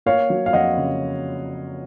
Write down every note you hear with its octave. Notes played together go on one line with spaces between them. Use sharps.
A#3 C#5 F5
F#3
F5
F2 D#5 F#5
C#3